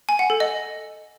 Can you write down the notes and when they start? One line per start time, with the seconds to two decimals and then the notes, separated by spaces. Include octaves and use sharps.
0.09 G#5
0.19 F#5
0.30 A4
0.40 D#5